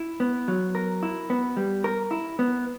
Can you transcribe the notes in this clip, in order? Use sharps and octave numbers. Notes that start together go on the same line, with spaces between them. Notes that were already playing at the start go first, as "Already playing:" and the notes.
Already playing: E4
B3
F#3
A#4
E4
B3
G3
A#4
E4
B3